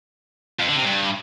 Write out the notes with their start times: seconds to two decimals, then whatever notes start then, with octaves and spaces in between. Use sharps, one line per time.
0.60 F2
0.68 D3
0.76 C3
0.84 G2